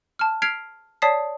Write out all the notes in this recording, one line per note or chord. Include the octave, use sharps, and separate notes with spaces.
A5 F6
F6 G#6 B6 C7 D7 F7
C#5 D5 A5 D#6 B6 C7